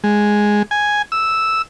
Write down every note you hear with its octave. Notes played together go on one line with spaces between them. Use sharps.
G#3
G#5
E6